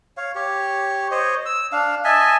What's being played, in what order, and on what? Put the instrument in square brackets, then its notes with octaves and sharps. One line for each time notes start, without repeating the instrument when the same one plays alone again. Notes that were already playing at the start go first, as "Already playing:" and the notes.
[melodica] C#5 F5
G4 C#5
C5 C#5 D#5
E6
D4 F5
D#5 E5 G#5 A5